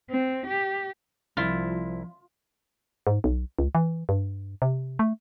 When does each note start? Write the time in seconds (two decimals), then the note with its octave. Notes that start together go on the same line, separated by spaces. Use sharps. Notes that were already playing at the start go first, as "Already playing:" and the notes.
0.10 C4
0.47 G4
1.37 C2 F3 E4 F4
3.07 G#2
3.24 B1
3.59 C#2
3.75 E3
4.09 G2
4.62 C3
4.99 A3